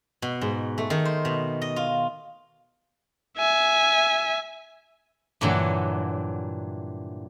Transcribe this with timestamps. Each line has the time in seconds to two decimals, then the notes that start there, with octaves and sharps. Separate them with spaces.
0.22 B2
0.41 G#2
0.78 A3
0.90 D#3
1.05 C5
1.25 B2
1.62 D#5
1.76 F4
3.37 E5 G#5
5.41 G2 A#2 D3 E3 F#3